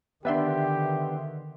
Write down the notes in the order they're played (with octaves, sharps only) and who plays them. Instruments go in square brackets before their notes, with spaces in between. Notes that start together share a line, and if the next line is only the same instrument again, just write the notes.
[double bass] D3 D#3 [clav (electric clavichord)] B3 D4 [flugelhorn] G4 [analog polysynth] B4 E5 C6